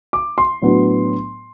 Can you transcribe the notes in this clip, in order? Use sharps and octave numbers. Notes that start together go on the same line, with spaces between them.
D6
C6
A2 F#3 B3 D4